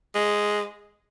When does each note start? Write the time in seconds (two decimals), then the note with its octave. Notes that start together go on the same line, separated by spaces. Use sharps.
0.15 G#3